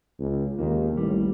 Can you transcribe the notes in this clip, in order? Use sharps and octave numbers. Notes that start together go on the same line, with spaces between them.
C#2
D#2 D#3 A#3
A1 G3